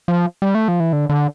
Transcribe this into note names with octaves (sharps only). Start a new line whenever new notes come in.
F3
G3
A3
F3
E3
D3
D3